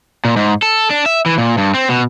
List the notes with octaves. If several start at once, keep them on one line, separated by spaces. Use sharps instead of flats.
A#2
G#2
A4
D4
E5
E3
A#2
G2
C4
B2